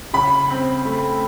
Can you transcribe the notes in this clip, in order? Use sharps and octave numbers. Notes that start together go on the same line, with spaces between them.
C#3 B5
C4
A3